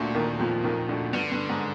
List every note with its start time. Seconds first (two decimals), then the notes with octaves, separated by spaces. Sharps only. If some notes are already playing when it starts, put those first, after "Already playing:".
Already playing: D2 A#2 D3
0.15 D#2 D#3
0.39 F2 F3
0.64 D#2 D#3
0.89 D2 D3
1.13 G2 D3
1.32 G2
1.49 G#2